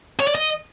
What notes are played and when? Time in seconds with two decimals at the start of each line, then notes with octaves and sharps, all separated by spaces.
0.20 C#5
0.27 D5
0.35 D#5